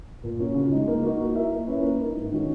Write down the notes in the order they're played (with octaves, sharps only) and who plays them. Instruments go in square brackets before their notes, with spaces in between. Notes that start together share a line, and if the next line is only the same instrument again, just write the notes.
[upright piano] A#2
A#3 C#4 F#4
C#3
G#3 D#4
A#3
D#4 F#4 A#4
A#3
E4 A#4 E5
A#3
C#4 E4 B4
A#3
D#4 A#4
G#2
D#3 G#3 C#4 F#4